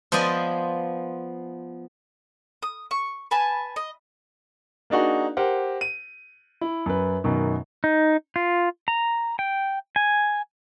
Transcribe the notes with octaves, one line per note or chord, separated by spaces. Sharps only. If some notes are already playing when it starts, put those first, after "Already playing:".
F3 B3 C5 D5 D#5 G#5
D#6
C#6
B4 G#5 A5
D#5
A#3 D4 D#4 F#4 G#4
G4 A#4 C5 F#5
D#7
E4
F#2 B4
F#2 B2 D#3
D#4
F4
A#5
G5
G#5